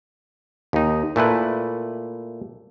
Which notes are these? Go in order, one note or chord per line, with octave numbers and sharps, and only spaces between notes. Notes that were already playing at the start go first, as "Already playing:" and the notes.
D#2 D#4
A#2 A3 E4 B4